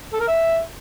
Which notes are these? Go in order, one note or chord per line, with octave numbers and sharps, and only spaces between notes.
A4
A#4
E5